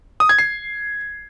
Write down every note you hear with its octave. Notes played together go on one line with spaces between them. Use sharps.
D#6
G#6
C7